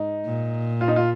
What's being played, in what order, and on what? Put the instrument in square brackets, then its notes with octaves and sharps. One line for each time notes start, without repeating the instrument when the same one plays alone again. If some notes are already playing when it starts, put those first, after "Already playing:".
Already playing: [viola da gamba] G#2 [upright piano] D#4
[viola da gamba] A#2
[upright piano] F4
D#4
F4